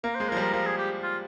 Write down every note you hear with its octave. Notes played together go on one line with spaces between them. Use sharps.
A#3 A#4
G#3 C5
F3 A#4
G3
A#4
F3 A#4
G#4
G4
F4